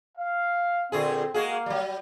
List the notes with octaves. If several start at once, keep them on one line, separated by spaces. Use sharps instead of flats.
F5
A#2 D3 C4 G#4
G#3 A#3 F#4 G#4 F5
F#3 G3